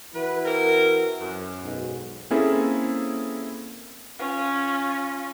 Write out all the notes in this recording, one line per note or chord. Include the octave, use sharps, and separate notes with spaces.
E3 E4 F#4 B4
C4 A#4
F#2
B1 G#2
A#3 C4 C#4 E4 G#4 A4
C#4 F4